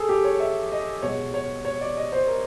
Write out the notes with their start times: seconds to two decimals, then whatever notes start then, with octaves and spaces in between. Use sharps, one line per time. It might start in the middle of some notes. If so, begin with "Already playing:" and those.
Already playing: G#4 A4
0.09 G4
0.24 C#5
0.40 E5
0.72 D#5
1.02 B2 G#3 C#5
1.34 C#5
1.65 C#5
1.81 D5
1.97 D#5
2.13 C5
2.27 A#4